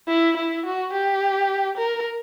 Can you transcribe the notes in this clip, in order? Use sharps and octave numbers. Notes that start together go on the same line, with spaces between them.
E4
E4
F#4
G4
A#4